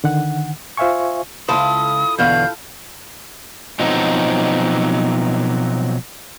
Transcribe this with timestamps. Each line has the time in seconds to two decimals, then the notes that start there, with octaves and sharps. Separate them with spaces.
0.04 D3 D#3 F#5
0.77 F4 C5 E5 F5 G#5 C#6
1.49 C#2 C3 E4 F4 A4 C5 D#6
2.19 E2 B2 D3 F5 G6
3.79 B2 F3 F#3 C4 D#4